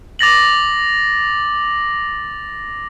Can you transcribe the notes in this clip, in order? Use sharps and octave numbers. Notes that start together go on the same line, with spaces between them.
D6 A6 A#6 F#7